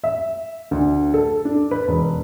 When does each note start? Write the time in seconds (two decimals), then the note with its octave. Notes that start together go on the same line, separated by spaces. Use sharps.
0.04 E5
0.71 D2
1.14 A4
1.45 D4
1.71 B4
1.88 E1